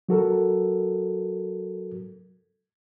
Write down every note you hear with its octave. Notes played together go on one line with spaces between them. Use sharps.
F#3 F#4 A4 A#4